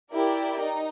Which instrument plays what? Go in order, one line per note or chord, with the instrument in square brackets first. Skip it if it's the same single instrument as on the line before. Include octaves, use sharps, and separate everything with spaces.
[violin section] E4 G4 A#4 D5 G5
D#4